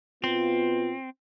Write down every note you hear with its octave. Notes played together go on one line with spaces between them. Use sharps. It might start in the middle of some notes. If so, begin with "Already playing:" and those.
B2 B3 C4 F4